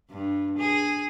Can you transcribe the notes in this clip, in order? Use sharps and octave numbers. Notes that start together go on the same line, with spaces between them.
G2
G#4